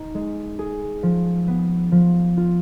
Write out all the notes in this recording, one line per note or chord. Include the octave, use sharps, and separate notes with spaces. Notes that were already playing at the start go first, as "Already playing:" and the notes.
Already playing: D#4
G#3
G#4
F3
B3
F3
F4